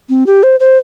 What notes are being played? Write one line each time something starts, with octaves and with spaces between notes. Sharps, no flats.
C4
G4
C5
C5